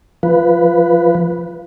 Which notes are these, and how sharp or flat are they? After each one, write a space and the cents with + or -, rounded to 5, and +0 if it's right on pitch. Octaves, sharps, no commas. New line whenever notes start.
F3 -15 B4 +0